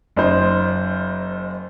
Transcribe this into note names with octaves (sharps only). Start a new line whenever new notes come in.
F#1 D#4 C5